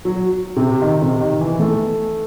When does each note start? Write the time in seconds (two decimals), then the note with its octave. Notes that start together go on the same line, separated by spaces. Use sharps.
0.05 F#3
0.57 C3
0.82 D#3
1.02 C3
1.21 D#3
1.41 E3
1.59 A3